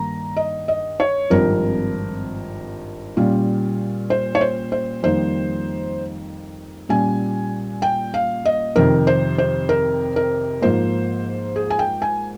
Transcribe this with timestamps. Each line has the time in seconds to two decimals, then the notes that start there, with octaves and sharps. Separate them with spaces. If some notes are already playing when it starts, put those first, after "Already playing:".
Already playing: G2 D#3 A#3 A#5
0.37 D#5
0.68 D#5
1.00 C#5
1.30 G#1 G2 F3 C4 A#4
3.17 A#2 G3 C#4 F4
4.10 C5
4.35 C#5
4.41 C5
4.72 C5
5.03 F2 D#3 G3 A#3 D#4 C5
6.89 A#2 G3 C#4 F4 G#5
7.82 G5
8.14 F5
8.45 D#5
8.76 F2 C3 D#3 A#4
9.07 C5
9.38 C5
9.69 A#4
10.16 A#4
10.62 G#2 F3 A#3 C5
11.56 G#4
11.70 G#5
11.79 G5
12.02 G#5